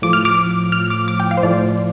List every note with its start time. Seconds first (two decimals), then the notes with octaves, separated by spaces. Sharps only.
0.02 A2 F3 D6
0.13 F6
0.25 D6
0.72 F6
0.90 D6
1.08 D6
1.20 G5
1.31 F5
1.37 C5
1.43 A2 F3 D5